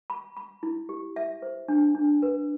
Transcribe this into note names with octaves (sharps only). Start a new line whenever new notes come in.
B5
B5
E4
G4
E5
C5
D4
D4
B4